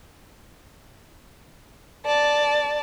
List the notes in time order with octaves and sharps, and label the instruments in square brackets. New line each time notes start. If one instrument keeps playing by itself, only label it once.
[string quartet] D5 A5